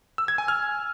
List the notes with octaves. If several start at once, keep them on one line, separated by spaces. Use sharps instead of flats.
E6
G#6
G#5
F6